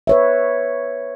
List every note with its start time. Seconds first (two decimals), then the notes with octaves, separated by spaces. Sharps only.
0.07 B4 C#5 E5